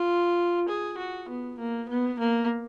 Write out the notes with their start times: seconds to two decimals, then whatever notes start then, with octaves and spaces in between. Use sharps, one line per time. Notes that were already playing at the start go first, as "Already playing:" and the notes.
Already playing: F4
0.68 G#4
0.98 F#4
1.28 B3
1.59 A#3
1.89 B3
2.19 A#3